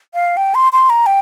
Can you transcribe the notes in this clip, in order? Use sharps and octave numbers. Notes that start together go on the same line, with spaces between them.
F5
G5
C6
C6
A#5
G5